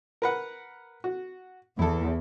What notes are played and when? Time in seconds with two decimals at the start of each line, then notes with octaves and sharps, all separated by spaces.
0.22 A#4 B4 F#5
1.04 F#4
1.79 E2 E4 A4